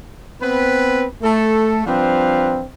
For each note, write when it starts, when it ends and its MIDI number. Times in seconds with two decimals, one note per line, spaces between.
0.41 1.05 59
0.41 1.05 60
0.41 1.05 71
1.22 1.81 57
1.22 1.81 69
1.85 2.63 53
1.85 2.63 55
1.85 2.63 60
1.85 2.63 62
1.85 2.63 71
1.85 2.63 77